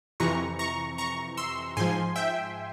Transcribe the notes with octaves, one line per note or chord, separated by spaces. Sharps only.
F2 C3 E3 A#5 C#6
A#5 C#6
A#5 C#6
C6 E6
G#2 F3 G#5 C6
E5 G5